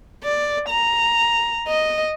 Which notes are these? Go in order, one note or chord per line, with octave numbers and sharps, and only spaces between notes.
D5
A#5
D#5